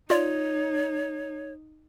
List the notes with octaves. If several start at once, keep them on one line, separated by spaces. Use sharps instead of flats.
D#4 F4 C#5 D5